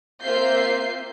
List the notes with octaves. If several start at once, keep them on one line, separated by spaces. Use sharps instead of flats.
A#3 C4 F4 E5 G6 C7